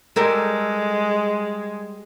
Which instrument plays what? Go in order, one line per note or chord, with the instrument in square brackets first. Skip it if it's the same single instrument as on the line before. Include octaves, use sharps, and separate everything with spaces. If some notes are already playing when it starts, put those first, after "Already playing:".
[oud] G3 A4 A#4 [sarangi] G#3